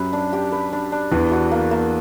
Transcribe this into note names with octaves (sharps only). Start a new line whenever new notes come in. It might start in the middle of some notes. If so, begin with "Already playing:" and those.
Already playing: F#2 F#3 G4 B4
D4
G4
B4
D4
D4
E2 E3 D4
F#4
A#3
A#3